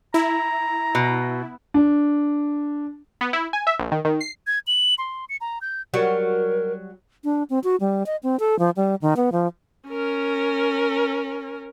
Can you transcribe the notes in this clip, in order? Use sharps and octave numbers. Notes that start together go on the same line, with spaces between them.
E4 A#5
B2
D4
B3
E4
G#5
E5
A#1
D#3
D#3
C7
G#6
F#7
C6
C#7
A#5
G6
F#3 G3 F#4 A#4
D4
C4
F#4
G3
D#5
C4
A4
F3
G3
D#3
B3
F3
C#4 A#4